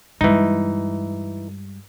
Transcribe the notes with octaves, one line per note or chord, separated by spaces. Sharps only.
G2 E3 G#3 D#4